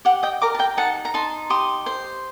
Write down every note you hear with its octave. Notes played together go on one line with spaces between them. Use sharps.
G4 F#5
D#5 G5
A#4 A#5 D6
A5
G5 A#5
D#4 F#5 A5
A#5
D#4 A5 C6
G4 C6 D#6
C5